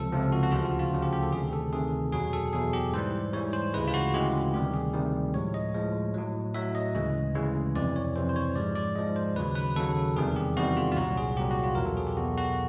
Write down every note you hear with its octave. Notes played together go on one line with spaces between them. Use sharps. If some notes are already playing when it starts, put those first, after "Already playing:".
Already playing: C#2 C3 F3 A4
C#2 C3 F3
F#4
F#4
D2 C#3 F3 F4
F#4
F4
D2 C#3 F3
G4
G4
A4
D2 C3 D#3 G#4
A4
D2 C3 D#3 G#4
E2 B2 F#3 G#4
A4
E2 B2 F#3 G#4
G4
G#2 E3 G3 C5
G#2 E3 G3 C#5
C5
D2 C#3 E3 G#3 B4
F4
F#4
D2 C#3 E3 G#3 G4
D2 C3 D#3 G3 G4
G#4
D2 C3 D#3 G3
A2 F3 G#3 C#5
D#5
A2 F3 G#3
A2 F#3
A2 F#3 E5
D#5
D2 C#3 E3 G#3
D2 C#3 E3 G#3
F2 C3 E3 D5
C#5
F2 C3 E3 C5
C5
C#5
G#2 F3 G#3 D5
D5
G#2 F3 G#3 D#5
C5
D#2 C#3 F#3 B4
B4
D#2 C#3 F#3 A4
E2 C3 D#3 G3 G#4
G4
E2 C3 D#3 G3 F#4
F4
F4
C2 A#2 F#3 F#4
G#4
C2 A#2 F#3 G4
F#4
F4
E2 B2 F#3 A#4
A4
G#4
G4
E2 B2 F#3 F#4
F#4